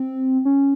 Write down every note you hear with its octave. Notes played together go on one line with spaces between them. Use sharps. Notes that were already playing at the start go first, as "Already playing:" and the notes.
Already playing: C4
C#4